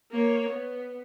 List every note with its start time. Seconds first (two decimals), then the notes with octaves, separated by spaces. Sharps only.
0.12 A#3 C#5
0.49 B3